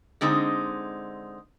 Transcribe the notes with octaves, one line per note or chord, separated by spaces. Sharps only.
D3 G#3 C4 D#4